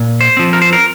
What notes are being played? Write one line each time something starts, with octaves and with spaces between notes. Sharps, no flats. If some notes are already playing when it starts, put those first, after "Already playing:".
Already playing: A#2
C5
F3 C4
A#4
C5
A#4